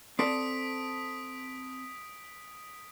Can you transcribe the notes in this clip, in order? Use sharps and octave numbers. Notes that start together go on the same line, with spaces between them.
C4 A4 D5 D#6 B6 D7